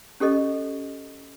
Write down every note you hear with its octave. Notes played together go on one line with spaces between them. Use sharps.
C#4 G4 A4 D#5